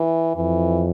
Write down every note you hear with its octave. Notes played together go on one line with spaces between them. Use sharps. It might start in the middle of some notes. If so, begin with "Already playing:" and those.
Already playing: E3
F2 E3